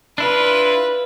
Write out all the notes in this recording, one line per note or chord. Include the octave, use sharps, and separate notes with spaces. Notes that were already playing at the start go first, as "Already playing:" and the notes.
D4 E4 F4 B4